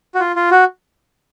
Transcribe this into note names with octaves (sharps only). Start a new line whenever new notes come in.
F#4
F4
F4
F#4